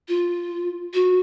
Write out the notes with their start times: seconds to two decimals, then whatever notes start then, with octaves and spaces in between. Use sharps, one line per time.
0.08 F4
0.94 F#4